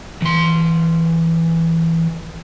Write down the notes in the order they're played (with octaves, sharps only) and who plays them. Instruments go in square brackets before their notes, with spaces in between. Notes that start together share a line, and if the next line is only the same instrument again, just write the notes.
[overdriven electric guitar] E3 C6